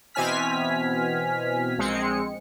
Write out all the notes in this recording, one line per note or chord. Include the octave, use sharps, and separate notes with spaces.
B2 E3 C4 G#5 F6 B6
A#1 G#3 C4 C#7